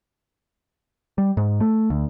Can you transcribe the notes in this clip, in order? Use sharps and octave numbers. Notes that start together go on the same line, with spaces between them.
G3
G#2
A3
D2